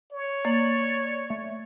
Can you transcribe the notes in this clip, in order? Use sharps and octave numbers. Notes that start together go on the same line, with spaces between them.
C#5
A#3 D5
A3